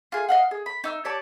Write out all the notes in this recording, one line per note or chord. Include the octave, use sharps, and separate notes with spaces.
F4 G#4
D#5 F5 F#5
G#4
B5
D#4 E6
G4 C#5 D5 A5